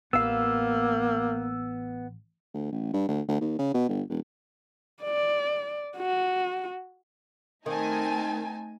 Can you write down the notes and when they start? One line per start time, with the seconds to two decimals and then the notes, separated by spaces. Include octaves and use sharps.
0.13 A1 A#3 B3 F5 E6
2.54 D2
2.72 A1
2.93 G2
3.08 D2
3.28 D2
3.41 D#2
3.59 C#3
3.74 B2
3.89 G1
4.10 E1
5.03 D5
5.97 F#4
7.66 D#3 A3 C4 D#4 G#5 A5